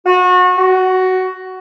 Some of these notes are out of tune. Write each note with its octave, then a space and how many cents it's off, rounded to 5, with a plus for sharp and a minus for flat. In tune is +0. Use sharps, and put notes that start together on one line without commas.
F#4 -30
F#4 +10